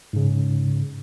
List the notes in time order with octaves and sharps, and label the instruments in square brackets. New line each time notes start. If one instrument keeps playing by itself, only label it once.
[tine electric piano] G#2 C#3